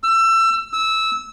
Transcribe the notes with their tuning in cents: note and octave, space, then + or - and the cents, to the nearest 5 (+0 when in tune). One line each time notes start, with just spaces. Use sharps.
E6 +25
E6 -15